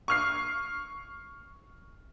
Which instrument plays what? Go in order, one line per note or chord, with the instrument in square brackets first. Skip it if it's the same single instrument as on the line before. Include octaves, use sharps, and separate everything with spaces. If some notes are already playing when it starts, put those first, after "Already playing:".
[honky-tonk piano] C#6 F6 C7